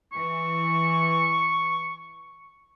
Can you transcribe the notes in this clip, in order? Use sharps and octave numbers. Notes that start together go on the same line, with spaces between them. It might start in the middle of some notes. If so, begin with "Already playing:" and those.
E3 C#6